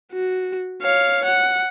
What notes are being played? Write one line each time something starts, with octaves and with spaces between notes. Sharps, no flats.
F#4
C#5 F5
F#5